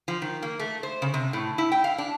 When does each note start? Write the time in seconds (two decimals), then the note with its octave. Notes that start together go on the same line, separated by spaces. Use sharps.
0.08 F3
0.22 D#3
0.43 A#3
0.59 A3
0.83 C5
1.02 C#3
1.14 C3
1.33 A2
1.58 E4
1.72 G5
1.84 F5
1.98 D4